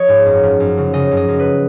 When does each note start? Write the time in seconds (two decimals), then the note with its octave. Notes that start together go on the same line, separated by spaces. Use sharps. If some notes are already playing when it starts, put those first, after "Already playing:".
Already playing: F3 C#5 D#5
0.08 G#2
0.26 F#2
0.43 F3
0.60 F#2
0.77 C#3
0.94 C#3 D#5
1.11 F#2
1.17 D#5
1.28 F#2
1.39 B4